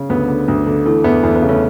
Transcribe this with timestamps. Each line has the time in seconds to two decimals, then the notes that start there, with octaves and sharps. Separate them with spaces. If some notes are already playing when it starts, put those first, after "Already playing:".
Already playing: C#3
0.09 D2 B3
0.28 D3
0.48 D2
0.67 D3
0.86 E3 A3
1.04 E2 B3
1.23 E2 A3
1.36 B3
1.42 C#3
1.49 A3 C#4